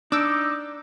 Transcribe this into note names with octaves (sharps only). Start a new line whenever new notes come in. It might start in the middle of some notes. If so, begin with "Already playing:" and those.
D4 D#4 D6 E6